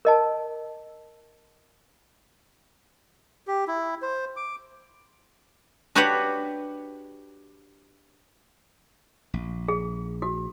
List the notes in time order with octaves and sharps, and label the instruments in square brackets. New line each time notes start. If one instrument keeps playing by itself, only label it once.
[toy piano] A#4 D#5 A5
[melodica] G4
E4
C5
D6
[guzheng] D4 F#4 G4 B4 C#5 F#5
[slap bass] A#1
[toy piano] G#4
F#4